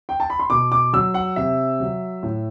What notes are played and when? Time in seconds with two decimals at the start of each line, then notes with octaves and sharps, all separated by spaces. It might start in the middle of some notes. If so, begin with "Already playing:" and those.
0.09 G5
0.20 A5
0.30 B5
0.39 C6
0.50 B2 D6
0.72 D6
0.93 F#3 E6
1.14 F#5
1.36 C3 E5
1.80 F#3
2.23 A2